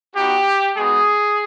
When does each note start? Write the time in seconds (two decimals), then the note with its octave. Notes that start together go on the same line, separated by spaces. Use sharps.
0.15 B3 D#4 F#4 G4
0.76 G#3 B3 D#4 F#4 G#4